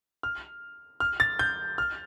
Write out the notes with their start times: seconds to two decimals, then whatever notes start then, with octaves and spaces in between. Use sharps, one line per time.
0.23 F6
1.00 F6
1.20 A6
1.39 G6
1.78 F6